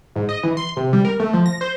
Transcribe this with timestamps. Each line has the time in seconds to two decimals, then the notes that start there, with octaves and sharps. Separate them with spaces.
0.16 G#2
0.29 D#5
0.43 E3
0.57 C6
0.77 C3
0.93 G3
1.05 A#4
1.20 A3
1.33 F3
1.46 A#6
1.61 C5